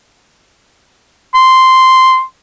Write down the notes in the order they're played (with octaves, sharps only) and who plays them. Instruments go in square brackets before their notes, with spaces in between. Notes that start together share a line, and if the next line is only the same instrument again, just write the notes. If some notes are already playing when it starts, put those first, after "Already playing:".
[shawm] C6